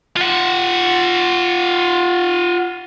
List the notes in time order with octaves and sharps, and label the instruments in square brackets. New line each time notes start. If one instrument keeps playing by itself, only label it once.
[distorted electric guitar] F4 F#5